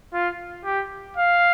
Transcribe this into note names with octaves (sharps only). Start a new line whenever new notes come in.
F4
G4
F5